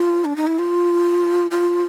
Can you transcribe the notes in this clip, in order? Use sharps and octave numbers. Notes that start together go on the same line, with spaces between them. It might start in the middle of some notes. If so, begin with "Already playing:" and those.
Already playing: F4
D4
D#4
E4
F4
F4